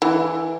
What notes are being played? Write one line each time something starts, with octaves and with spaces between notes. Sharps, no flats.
E3